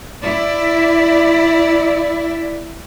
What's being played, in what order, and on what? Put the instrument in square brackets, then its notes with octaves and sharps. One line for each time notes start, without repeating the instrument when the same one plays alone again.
[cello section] E4 D5